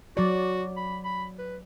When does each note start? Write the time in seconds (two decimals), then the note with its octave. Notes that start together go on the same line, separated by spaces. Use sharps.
0.17 F#3 F#4 D5
0.77 B5
1.04 B5
1.39 B4